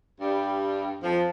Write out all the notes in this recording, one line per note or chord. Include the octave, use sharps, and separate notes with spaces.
G2 G3
F2 F3